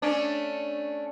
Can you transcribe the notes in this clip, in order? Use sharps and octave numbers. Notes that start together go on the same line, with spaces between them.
A3 C#4 D4